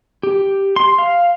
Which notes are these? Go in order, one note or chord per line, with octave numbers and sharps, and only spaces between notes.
G4
C6
F5